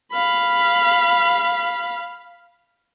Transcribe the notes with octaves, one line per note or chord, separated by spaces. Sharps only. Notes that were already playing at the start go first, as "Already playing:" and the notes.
F5 B5